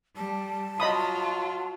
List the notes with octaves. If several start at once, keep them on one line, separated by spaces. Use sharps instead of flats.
G3 A5
F#3 F4 D#5 B5 D#6